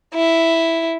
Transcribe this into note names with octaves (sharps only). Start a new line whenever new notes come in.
E4